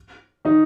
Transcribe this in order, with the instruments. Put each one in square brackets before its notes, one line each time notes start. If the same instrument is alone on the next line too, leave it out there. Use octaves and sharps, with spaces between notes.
[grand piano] D#3 D#4